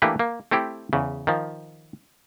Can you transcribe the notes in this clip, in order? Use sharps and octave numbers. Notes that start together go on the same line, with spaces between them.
E3 A3 A#3 D4 G4 B4
A#3
A3 C4 E4 G4
E2 C#3
D#3 F3